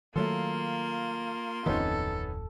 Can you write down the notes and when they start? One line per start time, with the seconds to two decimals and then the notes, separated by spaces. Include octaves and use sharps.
0.16 D#3 F#3 A3 A#3 F4 A4 C6
1.66 D1 F2 D#3 B3 C#4 D#4 A4